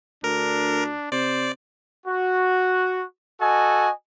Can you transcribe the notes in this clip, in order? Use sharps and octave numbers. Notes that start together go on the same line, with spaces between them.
D2 D4 A#4
C3 C5 D5
F#4
F#4 A4 D#5 G#5